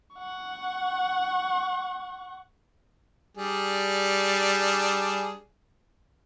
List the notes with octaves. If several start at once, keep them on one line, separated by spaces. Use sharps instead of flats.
F#5 C#6
G3 D4 G#4